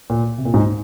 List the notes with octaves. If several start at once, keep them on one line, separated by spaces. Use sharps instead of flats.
A#2
C3
A#2
G#2